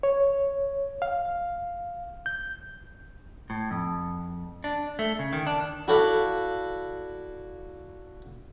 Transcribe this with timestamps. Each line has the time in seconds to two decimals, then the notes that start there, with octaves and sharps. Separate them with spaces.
0.03 C#5
1.02 F5
2.26 G6
3.50 A2
3.71 F2
4.64 D4
4.99 A3
5.19 C#3
5.33 D#3
5.47 D4
5.88 E4 F#4 A4 D5 F5